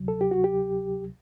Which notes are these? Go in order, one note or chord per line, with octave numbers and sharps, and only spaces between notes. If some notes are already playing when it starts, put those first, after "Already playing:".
Already playing: D2 C3 F#3
A4
G4
F#4
G4